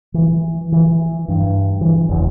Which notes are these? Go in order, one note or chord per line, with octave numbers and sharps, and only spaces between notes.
E3
E3
G2
E3
F#1 E2